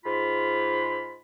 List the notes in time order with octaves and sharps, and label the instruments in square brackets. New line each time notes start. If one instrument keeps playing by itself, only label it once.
[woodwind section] G#2 F4 B5